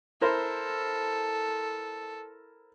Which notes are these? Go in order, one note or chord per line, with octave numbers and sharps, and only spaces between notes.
E4 A4 A#4 C5